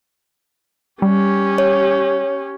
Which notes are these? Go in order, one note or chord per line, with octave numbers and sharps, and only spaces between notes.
G3 C#4 G4
C#5